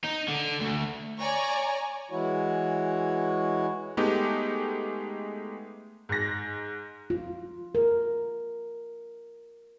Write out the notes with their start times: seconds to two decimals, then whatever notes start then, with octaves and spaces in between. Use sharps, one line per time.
0.04 D#4
0.28 D3
0.60 D2
1.18 C#5 D5 G#5 A#5 C#6
2.11 E3 G#3 E4 F#4 C#5
3.97 G#3 A3 B3 D#4 G4
6.09 G#2 A#6
7.10 F4
7.75 A#4